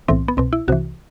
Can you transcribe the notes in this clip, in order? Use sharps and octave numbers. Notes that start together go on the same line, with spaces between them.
B1 A2 E3 C4
B3
C2 B2 C4
E4
C2 C3 E3 F#4